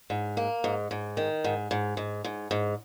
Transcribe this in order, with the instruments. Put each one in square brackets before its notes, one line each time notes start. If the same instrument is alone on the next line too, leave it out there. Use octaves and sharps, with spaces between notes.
[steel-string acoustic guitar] G#2
A#3
G#2
G#2
D#3
G#2
G#2
G#2
G#2
G#2